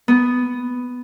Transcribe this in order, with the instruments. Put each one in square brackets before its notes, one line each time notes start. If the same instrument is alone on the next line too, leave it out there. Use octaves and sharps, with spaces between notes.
[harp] B3